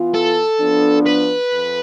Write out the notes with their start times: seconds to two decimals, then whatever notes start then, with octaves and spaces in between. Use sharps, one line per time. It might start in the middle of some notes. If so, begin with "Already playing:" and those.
Already playing: E3 B3 F4
0.14 A4
0.60 F3 B3 D4
1.06 B4
1.52 F2